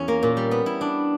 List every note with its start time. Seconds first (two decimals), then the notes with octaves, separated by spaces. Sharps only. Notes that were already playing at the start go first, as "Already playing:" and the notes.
Already playing: E2 C#4
0.08 A#3
0.23 A#2
0.37 G3
0.51 B3
0.66 E4
0.81 D4